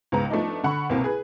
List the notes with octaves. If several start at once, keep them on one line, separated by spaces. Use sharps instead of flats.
C#2 G#2 B3 A#5
F3 A3 B3 D4 D#4
D3 F#5 B5 C#6
C2 B2 A#3 C4
G#4 B4